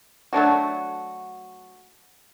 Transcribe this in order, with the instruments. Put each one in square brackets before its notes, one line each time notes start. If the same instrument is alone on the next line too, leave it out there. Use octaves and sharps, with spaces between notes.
[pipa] F#3 A3 D4 F#4